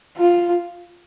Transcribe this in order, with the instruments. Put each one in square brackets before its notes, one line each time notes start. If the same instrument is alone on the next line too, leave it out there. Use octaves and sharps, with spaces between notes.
[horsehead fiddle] F4